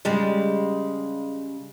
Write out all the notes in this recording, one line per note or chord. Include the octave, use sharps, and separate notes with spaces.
C#3 G3 G#3